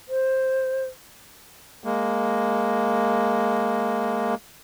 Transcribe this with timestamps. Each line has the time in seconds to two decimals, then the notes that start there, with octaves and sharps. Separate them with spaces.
0.09 C5
1.84 G#3 A#3